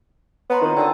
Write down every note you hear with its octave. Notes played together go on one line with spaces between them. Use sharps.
B3 C#5 A#5 C6
D#3 C4 F4
D3 G5 A5 E6